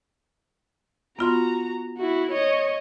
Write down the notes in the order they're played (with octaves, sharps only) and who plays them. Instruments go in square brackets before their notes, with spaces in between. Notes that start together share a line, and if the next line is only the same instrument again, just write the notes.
[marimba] B3 F4 C6 [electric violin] F#4 A#5
[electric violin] E4 F#4
C#5 D#5